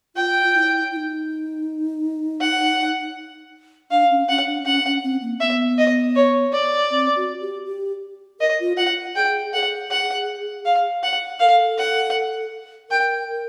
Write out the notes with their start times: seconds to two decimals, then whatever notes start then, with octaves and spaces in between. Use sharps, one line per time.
0.16 F4 G5
0.54 E4
0.92 E4
0.96 D#4
2.40 F#5
3.91 D4 F5
4.10 C#4
4.28 C#4 F#5
4.46 D4
4.66 C#4 F#5
4.85 C#4
5.03 C4
5.22 A#3
5.41 B3 E5
5.78 D#5
6.16 C#5
6.53 D5
6.91 C4
7.16 F#4
7.41 G4
7.66 G4
8.40 A#4 D#5
8.60 F4
8.77 F4 F#5
9.16 G#4 G5
9.53 A4 F#5
9.57 G#4
9.91 F#5
10.65 F5
11.03 F#5
11.40 A#4 F5
11.44 A4
11.78 F#5
12.90 A#4 G5